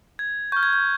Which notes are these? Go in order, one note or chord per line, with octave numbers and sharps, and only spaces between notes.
G#6
C#6 F6 G6
G#6
G6